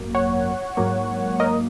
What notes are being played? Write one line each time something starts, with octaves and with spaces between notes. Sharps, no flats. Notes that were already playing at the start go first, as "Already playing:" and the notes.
Already playing: G#1 F#2 F#3 A#3
C#5 F#5
G#2 F#3 A#3
A#4 D#5